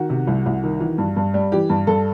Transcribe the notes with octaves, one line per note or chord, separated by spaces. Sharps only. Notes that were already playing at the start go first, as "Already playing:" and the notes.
Already playing: D#3 F#4
C3
C2
C2
D#3
E3
G2
G2
G3
E3 G4
G2
G2 A4